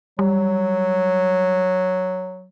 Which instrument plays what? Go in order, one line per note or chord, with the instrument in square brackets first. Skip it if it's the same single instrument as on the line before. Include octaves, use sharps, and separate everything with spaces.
[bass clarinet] F#3 [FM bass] G3